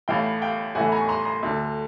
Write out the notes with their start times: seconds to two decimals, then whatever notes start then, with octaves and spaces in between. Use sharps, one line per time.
0.08 A1 A2 E3 F5 G5
0.42 F5 G5
0.75 A1 A2 E3 F#5 G#5
0.92 G#5 A#5
1.00 C#6
1.09 A#5 C6
1.25 A#5 C6
1.43 D2 D3